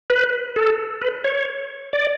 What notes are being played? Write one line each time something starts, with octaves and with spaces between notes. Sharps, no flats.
B4
A4
B4
C#5
D5